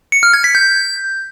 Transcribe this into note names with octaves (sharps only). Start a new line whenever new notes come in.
C#7
F6
G#6
B6
G6